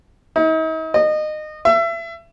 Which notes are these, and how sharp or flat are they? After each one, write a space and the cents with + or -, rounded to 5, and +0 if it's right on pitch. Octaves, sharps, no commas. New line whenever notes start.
D#4 +45
D#5 -25
E5 +30